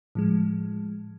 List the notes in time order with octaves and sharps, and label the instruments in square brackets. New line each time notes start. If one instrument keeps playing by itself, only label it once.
[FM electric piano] A2 F3 G#3